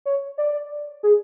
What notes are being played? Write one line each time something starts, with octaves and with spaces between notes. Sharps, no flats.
C#5
D5
G#4